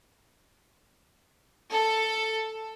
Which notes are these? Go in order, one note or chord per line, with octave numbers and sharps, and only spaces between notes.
A4